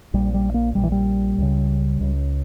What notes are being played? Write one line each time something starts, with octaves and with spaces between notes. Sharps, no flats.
A#1 A#2 G3
G3
A#3
A#1 A#2 G3
E3
G3
C#2 C#3
C#2 C#3